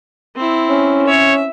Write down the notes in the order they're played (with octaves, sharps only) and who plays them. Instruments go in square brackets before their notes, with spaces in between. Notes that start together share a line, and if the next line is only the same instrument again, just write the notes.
[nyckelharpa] C4 E4
[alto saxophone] C#4
[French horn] C#5 [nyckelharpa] E5